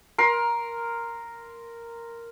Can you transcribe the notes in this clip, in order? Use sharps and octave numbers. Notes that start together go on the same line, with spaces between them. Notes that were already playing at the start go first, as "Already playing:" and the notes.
A#4 C6